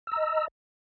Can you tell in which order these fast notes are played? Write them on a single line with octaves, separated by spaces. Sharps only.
E6 A#5 D#5